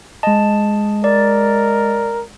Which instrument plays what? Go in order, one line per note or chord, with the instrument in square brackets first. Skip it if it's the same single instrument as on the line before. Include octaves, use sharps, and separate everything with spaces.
[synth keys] G#3 D#5 [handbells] A5
[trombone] A#4 [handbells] D5